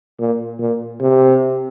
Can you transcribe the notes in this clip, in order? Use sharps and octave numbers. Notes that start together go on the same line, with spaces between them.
A#2
A#2
C3